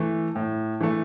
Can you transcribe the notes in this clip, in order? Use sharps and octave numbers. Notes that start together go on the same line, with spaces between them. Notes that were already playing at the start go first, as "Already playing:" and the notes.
Already playing: E3 A3
A2
E3 A3